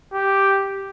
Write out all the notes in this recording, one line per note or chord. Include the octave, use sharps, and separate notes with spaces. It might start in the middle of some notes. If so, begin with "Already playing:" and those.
G4